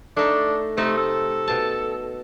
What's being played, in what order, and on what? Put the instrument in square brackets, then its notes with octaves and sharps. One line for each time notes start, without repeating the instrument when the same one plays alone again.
[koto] A3 D#4 [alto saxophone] D4
[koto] C3 C4 D#4 [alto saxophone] A3
[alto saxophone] A4
[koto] B2 A5